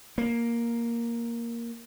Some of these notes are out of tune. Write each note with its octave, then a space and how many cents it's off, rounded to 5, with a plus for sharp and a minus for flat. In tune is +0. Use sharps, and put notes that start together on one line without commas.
A#3 +5